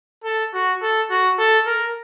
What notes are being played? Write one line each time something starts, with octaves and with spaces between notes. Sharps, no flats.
A4
F#4
A4
F#4
A4
A#4